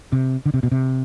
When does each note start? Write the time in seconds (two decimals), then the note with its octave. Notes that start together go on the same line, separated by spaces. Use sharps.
0.12 C3
0.46 D3
0.54 C3
0.63 B2
0.71 C3